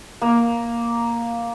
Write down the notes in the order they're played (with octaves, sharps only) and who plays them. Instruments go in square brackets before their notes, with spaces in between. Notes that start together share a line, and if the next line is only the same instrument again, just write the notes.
[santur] A#3